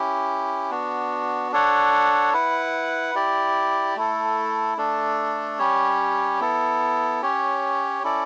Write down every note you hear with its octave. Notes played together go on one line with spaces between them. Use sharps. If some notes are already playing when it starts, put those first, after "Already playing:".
Already playing: C#4 E4 G4
B3 D4 F#4
D4 A4 C#5 F#5
E4 B4 F#5
E4 G4 D5
A3 E4 A4
A3 D4 A4
G3 C#4 G4 C#5
B3 E4 A4
C#4 G4 C#5
C#4 E4 A4 D5